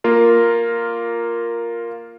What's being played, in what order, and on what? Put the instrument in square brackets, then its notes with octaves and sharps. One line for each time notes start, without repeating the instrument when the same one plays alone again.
[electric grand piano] A#3 F4 A#4